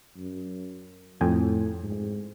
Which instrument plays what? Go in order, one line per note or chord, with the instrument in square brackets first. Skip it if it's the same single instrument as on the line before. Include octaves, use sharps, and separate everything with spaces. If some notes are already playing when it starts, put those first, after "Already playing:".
[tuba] F#2
[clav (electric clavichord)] F2 G5 G#5 [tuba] A2
[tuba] G#2